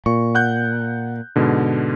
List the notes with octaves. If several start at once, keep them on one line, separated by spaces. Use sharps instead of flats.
A#2 C#6
F#5 F#6 G6
G#2 B2 D3